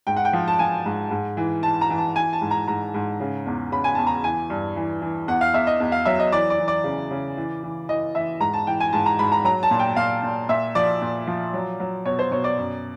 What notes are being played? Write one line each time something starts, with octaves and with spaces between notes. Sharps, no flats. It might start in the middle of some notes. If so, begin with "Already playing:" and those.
G#2 G5
F#5
G5
F3
A5
F3 G#5
G#2
G#2
E3
E3 A5
A#5
E3
A5
E3 G#5
A5
G#2
A#5
G#2 A#5
G#2
C#3
E2
C#3 B5
G#5
E2 A5
A#5
E3 G#5
G2
E3
E3
E2 F#5
F5
E2 E5
D#5
E2
F5
F#3 E5
D#5
E3 D5
D5
E3
D5
C#3
C#3
E3
E3
E3 D#5
E3 E5
G#2 A#5
A5
E3 G5
G#5
G#2 A5
A#5
G#2 B5
A#5
F#3 A#5
A5
A#2
G5
A#2 F5
A#2
A#2 E5
F3 D5
A#2
F3
F#3
F#3
B2 C#5
C5
B2 C#5
D5
F#2